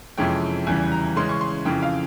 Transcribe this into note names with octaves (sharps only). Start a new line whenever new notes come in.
F2 C3 E3 G#3 C#4 G5
E2 C#3 E3 G3 G#5
A#5
C#3 E3 G#3 C#4 C6
C#6
C6
F2 C#3 E3 G5
F5